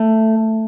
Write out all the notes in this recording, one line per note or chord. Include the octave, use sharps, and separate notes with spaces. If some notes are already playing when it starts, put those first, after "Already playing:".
Already playing: A3